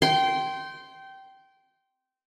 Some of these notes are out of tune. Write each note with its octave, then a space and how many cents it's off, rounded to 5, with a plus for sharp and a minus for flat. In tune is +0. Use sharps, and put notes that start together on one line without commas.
G5 -20 C6 +0